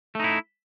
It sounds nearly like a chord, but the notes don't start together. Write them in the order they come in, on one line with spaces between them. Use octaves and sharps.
A3 D#4 E4